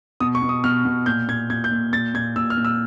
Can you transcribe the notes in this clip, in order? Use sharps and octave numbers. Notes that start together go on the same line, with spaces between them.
B2 D#6
C#6
B2
D#6
B2 F6
B2
A#2 G6
A#2 G#6
A#2 G#6
G6
A#2
A#2 A6
A#2 G#6
A#2 E6
F6
A#2
E6